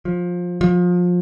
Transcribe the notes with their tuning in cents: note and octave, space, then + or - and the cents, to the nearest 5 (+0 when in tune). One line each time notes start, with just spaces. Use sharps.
F3 +20
F3 +25